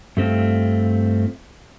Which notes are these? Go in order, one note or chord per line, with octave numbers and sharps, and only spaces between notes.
G2 A3 C4 F4